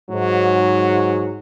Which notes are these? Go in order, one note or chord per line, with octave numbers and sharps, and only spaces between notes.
G#2 F#3